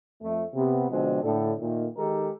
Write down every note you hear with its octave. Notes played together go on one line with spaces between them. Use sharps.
F2 A3
C3 B3
B2 D3 F3 G#3 C4
A2 D3 A4
A#2 D#3 A3
D#3 G#3 D#4 G4 A4 A#4